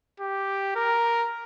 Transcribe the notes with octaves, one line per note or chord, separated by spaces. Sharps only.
G4
A#4